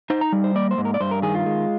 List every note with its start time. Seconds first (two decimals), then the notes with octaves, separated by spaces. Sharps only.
0.10 D#4 C5
0.21 A#5
0.32 G3
0.44 C5
0.55 A#3 D5
0.71 C5
0.78 G#2
0.85 A#4
0.94 D5
1.00 G2 C5
1.11 A#4
1.22 D#3 G#4
1.35 F4
1.46 G#3